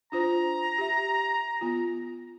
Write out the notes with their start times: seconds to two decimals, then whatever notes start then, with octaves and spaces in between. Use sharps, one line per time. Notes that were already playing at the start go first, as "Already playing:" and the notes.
0.12 D4 F4 C5 A#5
0.78 G4 E5
1.61 B3 F4